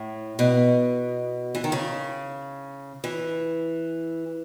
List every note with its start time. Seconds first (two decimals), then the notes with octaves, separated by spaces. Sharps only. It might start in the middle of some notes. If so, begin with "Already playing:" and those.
Already playing: A2
0.39 B2
1.55 E3
1.64 D#3
1.72 C#3
3.04 E3